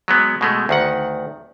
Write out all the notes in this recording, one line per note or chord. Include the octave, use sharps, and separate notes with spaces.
F#3 G#3 B3
B2 G#3 A3
D2 D#3 F#5